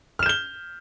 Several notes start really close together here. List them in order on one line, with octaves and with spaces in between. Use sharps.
F6 E7 G6 G7